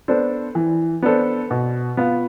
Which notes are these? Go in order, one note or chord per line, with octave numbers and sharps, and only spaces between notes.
B3 D4 A4 C5
E3
B3 D4 A4 C5
B2
B3 F4